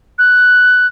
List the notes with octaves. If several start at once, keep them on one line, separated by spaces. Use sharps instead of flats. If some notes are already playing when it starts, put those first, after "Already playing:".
F#6